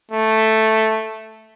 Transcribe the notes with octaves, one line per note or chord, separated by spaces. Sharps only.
A3